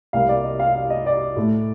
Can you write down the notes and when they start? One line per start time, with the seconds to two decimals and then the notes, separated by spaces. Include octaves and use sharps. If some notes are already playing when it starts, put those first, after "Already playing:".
0.13 C2 C3 G3 A#3 F5
0.29 D5
0.44 D#5
0.60 F5
0.75 F5
0.90 D#5
1.06 D5
1.36 A2 A3